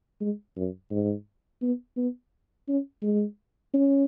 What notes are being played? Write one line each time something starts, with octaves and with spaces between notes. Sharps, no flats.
G#3
F#2
G#2
B3
B3
C#4
G#3
C#4